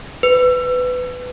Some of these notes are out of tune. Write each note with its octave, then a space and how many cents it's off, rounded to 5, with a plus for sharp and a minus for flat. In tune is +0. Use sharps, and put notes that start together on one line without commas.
B4 +20